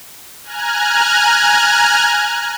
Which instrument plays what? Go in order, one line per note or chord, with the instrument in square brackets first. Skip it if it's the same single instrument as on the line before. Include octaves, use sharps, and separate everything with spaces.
[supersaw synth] G#5 A#5 F6 F#6 G#6